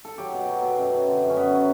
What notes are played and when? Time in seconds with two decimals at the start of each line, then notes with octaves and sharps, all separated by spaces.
0.05 A4
0.18 F#3 G4
0.33 B2
0.49 F#3
0.62 B2
0.78 F#2
0.92 F#3
1.08 D3
1.22 F#2
1.30 C#4
1.37 F#2 B3
1.51 F#3